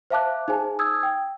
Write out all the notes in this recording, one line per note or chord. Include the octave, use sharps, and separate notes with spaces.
C5 E5 F5 A5 D6 F#6
D#4 G#4 C5 G#5 A5
D#6 E6 G#6
G5